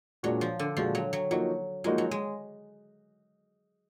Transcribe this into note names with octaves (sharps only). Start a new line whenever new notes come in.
A#2 F#3 G#3 D4 F#4
F3
D3
A#2 F3 G#3 D4 F#4
F#3
F#3
F3 F#3 A#3 D#4 F#4
F3 G#3 A#3 D#4 F#4
F#3
G#3